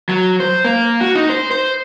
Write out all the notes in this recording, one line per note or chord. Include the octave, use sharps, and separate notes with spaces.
F#3
C5
A#3
F#4
D#4
C5
C5